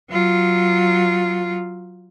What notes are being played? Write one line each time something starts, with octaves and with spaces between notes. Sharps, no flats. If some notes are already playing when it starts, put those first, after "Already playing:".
F#3 F4